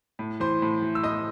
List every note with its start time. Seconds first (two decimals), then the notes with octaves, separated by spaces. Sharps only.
0.19 A2
0.40 E3 C5 C6
0.62 A2
0.82 E3
0.95 E6
1.03 A2 D#5 D#6